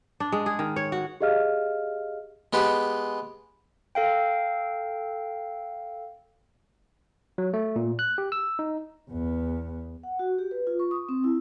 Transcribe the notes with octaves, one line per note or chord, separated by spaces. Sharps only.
D4
G#3
G#4
D#3
C#5
F#4
G4 G#4 D#5 F5 F6
G#3 B3 G4 B4
A4 F5 G5
F#3
A3
A#2
F#6
G4
E6
D#4
E2 B3
F#5
F#4
G4
B4
F4
C#6
D#6
C4
E4